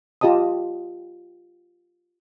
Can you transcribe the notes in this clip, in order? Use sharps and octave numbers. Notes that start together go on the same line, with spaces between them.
F4 G4 D#5 A5 D#6